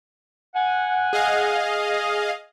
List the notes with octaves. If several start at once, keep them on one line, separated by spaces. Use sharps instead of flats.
F#5 G#5
G#4 D#5 F5